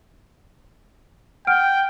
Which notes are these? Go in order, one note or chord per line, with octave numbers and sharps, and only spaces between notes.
F#5 G5 F6 D7